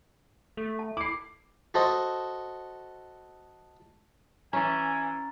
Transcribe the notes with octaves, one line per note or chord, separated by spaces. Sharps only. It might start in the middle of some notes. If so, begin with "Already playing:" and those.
A3 A4
A5
E4 D6 C7
F#4 A4 C5 D#5
E3 C#4 G#5 A#5 A6